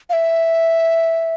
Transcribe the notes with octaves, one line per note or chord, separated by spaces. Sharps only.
F5
E5